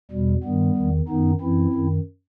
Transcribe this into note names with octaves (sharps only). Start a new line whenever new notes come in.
E2 B2 G3
G2 D#3 G3 B3
E2 D#3
F#2 D#3 B3 D#4
F#2 E3 C4 E4
F#2 D#3